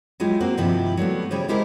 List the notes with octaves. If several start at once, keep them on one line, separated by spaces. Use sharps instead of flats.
F#3 G#3 E4 F4 G4
A#3 C4 F#4
G2 C3 D#3 F3 E4 G4
F#3 G3 A3 B3
C#3 G3 C#4 E4 G#4 C5
G#3 E4 G4 G#4 A#4 C5